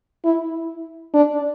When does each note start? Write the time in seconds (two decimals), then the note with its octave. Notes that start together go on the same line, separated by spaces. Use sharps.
0.25 E4
1.14 D4